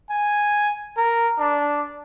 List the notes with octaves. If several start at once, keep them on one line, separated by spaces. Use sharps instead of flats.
G#5
A#4
D4